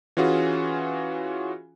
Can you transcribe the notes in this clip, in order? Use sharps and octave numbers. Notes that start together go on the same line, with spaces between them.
E3 C#4 F4 F#4 G#4